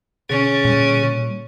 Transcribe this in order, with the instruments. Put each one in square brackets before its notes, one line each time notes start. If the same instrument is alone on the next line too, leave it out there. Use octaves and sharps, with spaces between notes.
[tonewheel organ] B2 D3 G#4 [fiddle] C#4
[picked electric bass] A#2 G3